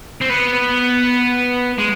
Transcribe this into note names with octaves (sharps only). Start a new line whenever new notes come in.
C4
B3
G#3